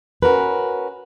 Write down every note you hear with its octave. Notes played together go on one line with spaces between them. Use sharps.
C#4 F#4 A#4 B4